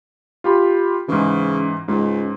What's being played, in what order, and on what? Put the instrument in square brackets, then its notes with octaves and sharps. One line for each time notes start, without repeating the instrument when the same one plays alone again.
[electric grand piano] F4 G4 B5
[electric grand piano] G#2 E3 [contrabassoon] C#3
[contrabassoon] C#2 [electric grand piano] G#2